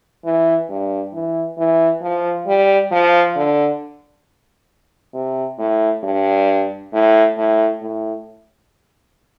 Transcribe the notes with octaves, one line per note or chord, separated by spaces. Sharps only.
E3
G2
E3
E3
F3
G3
F3
D3
C3
A2
G2
A2
A2
A2